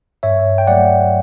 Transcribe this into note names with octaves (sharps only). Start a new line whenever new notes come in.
G2 C#5 E5
G5
F#3 A3 D5 F#5